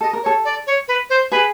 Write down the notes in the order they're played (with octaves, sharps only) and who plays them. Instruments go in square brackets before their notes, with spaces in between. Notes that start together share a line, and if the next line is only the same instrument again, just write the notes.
[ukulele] A4 [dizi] D#5
[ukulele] A#4
[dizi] C#5
[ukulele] A4
[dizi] D5
C#5
B4
C5
[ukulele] G#4 [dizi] B4